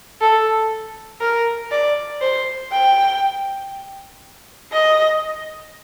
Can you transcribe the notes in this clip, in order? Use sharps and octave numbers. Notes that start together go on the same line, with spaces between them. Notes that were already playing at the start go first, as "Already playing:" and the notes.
A4
A#4
D5
C5
G5
D#5